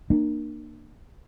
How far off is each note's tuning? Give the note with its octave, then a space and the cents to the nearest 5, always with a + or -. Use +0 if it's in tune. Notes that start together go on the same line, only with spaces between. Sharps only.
A#3 +0 D4 +45